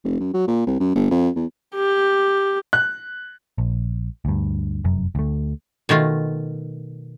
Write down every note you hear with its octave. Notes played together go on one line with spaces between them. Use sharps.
F1
F#2
F#3
A#2
C2
F#2
G1
F2
E2
G4
F#6
A#1
D2 G2
F1 F#2
D2 A3
B2 D#3 A3 F4